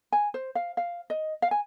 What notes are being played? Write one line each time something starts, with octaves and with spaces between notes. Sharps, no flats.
G#5
C5
F5
F5
D#5
F5
G#5